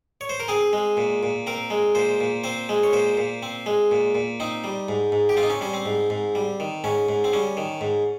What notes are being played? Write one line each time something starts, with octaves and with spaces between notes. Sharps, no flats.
C#5
C5
A#4
C4 G#4
G#3
A#2
A#2
C4 A#4
G#3
A#2 C5
A#2
C4 C5
G#3
C#5
A#2 C5
A#2
C4
G#3
A#2
A#2
C4 D#4
G3
G#2
G#2
G4
C4 F4
D#4
C#4
G3 C#4
C4
G#2
G#2
G3
D#3
G#2 C#4
G#2
C4
G3 C#4
D#3
G#2